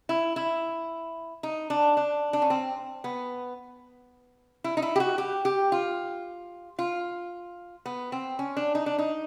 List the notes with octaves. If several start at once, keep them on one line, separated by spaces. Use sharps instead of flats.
E4
E4
D#4
D4
D4
D4
C#4
C4
B3
E4
D#4
E4
G4
F#4
G4
G4
F4
F4
B3
C4
C#4
D4
D#4
D4
D#4